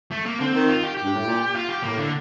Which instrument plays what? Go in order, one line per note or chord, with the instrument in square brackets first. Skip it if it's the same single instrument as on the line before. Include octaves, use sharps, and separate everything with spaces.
[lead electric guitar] A3
A#3
[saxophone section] D3 [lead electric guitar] C4
[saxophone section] D#3
[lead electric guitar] F4
G4
G4
[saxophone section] G2
A2
A#2
[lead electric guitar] F4
G4
[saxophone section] A2 [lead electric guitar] A#3
[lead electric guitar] D3